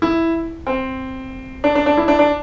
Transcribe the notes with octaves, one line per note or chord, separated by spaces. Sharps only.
E4
C4
D4
D4
D4
E4
D4
D4